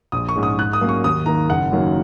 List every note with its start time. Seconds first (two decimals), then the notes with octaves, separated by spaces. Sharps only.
0.12 A#1 D#6
0.29 C#6
0.36 G#2 G#3 C#4
0.43 D#6
0.58 G#2 F#6
0.73 D#6
0.81 F#3 A#3 C#4
0.89 C#6
1.04 D#2 D#6
1.26 D#3 A#3 A#5
1.49 F#1 F#5
1.71 F#2 D#3 F#3 A#3